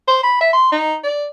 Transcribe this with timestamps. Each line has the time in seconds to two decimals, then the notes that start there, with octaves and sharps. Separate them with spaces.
0.08 C5
0.23 B5
0.41 E5
0.53 C6
0.72 D#4
1.04 D5